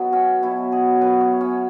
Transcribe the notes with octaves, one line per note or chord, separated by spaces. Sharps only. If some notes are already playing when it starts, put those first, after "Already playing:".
Already playing: B2 F#3 B3
C#4
B2 F#3 E4
G#4
F#2 F#3 B4
C#5
C#4